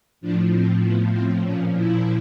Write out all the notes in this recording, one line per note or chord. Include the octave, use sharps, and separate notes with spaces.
A2 F3 D4
C4
B3
C4
A#2 F3 C#4
E4